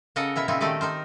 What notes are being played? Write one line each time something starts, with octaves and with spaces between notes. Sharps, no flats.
C#3 A4 A#4 D#5 F#5
B2 E4 A#4 E5
A#2 C#3 C4 D#4 E4
D#3 A3 G4 D5 D#5
D#4 A#4 C5